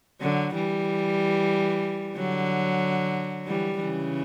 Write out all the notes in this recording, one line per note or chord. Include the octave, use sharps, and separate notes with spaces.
D3 F#3
E3 G3
D3 F#3
E3 G3
C#3 E3